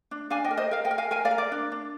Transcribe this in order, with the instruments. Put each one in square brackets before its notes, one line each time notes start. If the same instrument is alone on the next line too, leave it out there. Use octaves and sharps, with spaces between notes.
[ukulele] D4
D4 F5 G#5
D#5 G5
A#4
C5 D#5
A#4 F5
D#5 G5
A#4
F5 G#5
A#4 F5 G#5
D5 F5
A#4
D5
D4
D4